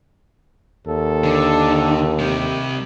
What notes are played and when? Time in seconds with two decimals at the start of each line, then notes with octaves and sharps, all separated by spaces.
0.87 D#2 A4
1.24 D3
2.19 C3 G3